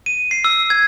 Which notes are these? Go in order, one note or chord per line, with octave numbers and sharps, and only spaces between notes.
D#7
C7
E6
G#6